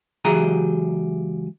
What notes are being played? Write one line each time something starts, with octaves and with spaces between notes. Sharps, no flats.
C#2 E3 F#3 G4 G#4 A#5